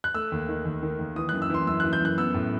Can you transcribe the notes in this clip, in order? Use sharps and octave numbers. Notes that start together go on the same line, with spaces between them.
F#6
A3 E6
D#2
D#3
D#2
D#3
D#2
E3 D#6
F#6
F#2
E6
E3 C6
F#2 E6
F#6
E3
G6
F#2 F#6
B3 E6
A2